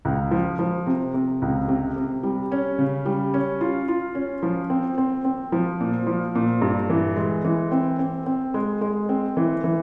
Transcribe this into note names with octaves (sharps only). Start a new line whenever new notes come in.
C#2
F3
F3
C3
C3
C#2
C3
C3
G3
C#4
C#3
G3
C#4
F4
F4
C#4
F3
C4
C4
C4
F3
A#2
F3
A#2
G2
E3
G#3
E3
C4
C4
C4
G#3
G#3
C4
E3
E3